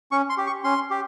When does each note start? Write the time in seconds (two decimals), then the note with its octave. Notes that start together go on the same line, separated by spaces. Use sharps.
0.12 C#4 C#6
0.30 C6
0.38 G4
0.47 C#6
0.64 C#4 C6
0.90 G4